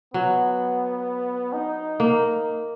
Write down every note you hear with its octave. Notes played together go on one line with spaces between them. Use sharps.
F#3 B3
D#4
A#3